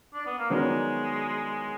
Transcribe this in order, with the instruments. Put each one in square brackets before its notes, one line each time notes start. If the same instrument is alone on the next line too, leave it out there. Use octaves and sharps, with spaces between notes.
[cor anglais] D4
B3
A#3
[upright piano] D#3 F#3 B3 D4 F#4 [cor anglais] G#3